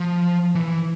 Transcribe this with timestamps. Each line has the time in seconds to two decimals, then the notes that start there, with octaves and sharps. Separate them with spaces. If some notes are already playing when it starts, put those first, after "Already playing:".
Already playing: F3
0.55 E3